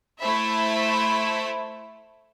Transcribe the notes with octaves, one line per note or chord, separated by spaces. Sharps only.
A3 E4 A4 C5 E5 B5